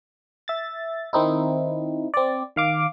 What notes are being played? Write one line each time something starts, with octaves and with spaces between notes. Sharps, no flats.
E5 A6
D#3 C4 D#4 E4
C4 D5
D#3 F5 D6